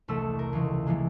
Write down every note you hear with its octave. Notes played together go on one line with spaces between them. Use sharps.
E1 C2 A3 E6 B6
A#4
C#2 E3
E3 F3 G#3 A#3